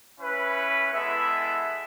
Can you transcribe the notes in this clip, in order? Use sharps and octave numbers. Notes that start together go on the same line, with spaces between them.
C#4 E4 B4
G#3 B3 E4 A4 E5